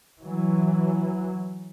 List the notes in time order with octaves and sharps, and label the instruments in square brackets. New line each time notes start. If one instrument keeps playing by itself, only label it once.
[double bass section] E3 F#3